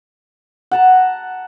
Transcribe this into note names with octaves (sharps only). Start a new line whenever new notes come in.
F#5 A5 A#5